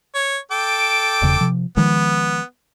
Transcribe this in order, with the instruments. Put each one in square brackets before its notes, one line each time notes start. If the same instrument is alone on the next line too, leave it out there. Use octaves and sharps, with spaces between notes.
[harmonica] C#5
A4 G5 D6
[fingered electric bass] E1 E2 C#3
C3 F3
[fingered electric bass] D#3 F3 G#3 [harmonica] B3